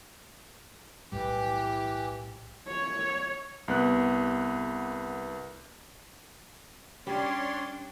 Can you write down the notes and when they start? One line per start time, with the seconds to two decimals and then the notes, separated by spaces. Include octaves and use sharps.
1.12 B1 A2 E3 G3 G4
2.68 C#5
3.68 C2 B3 F#6
7.07 G3 C#4 D4 C#5 D5 C6